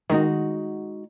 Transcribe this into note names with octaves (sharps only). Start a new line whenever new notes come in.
D#3 G#3 D#4 F#4